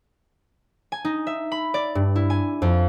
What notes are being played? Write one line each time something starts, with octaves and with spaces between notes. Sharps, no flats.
G#5
D#4
E5
B5
D5
G2
E4
G#5
F2